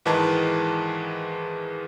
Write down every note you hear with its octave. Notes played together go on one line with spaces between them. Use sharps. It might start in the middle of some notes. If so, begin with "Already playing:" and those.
G#2 D#3 E3 G#3 B4 A5